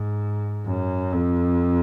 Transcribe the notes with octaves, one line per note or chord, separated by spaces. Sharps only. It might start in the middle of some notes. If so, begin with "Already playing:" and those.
Already playing: G#2
F#2
F2